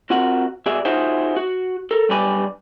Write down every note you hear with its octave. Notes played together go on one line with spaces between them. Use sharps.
C4 F4 F#4 A#4 F#5
B2 F#4 G#4 D5 E5
D#4 F4 F#4 G#4 C5 E5
F#4
A4 A#4
B1 G2 G3 B4 D5 G#5